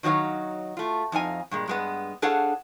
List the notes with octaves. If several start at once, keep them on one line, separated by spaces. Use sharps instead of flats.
D#3 F#3 D#4 C#5 F5
A3 F4
F2 D#4 F5 G#5
G2 A#2 G#3
G2 G#3 B3
D4 G#4 A4 C#5 F5 F#5